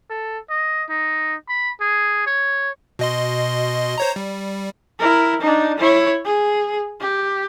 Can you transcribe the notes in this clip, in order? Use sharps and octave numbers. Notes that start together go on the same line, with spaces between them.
A4
D#5
D#4
B5
G#4
C#5
B2 D#5 C6
C5 C#5 A#5
G3
E4 A#4
D4 D#4
E4 C#5
G#4
G4